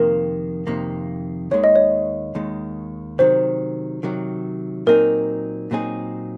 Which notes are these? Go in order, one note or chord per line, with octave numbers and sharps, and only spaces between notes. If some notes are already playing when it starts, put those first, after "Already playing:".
Already playing: F2 C3 D#3 A#3 A#4
F2 C3 D#3 A#3
D#2 D#3 G#3 C#5
D#5
C#5
D#2 D#3 G#3
C3 D#3 F#3 C5
C3 D#3 F#3
A#2 F#3 C4 D#4 G#4 A#4
A#2 F#3 C4 D#4 G#4